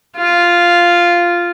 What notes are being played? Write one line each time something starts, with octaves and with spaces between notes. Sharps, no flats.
F4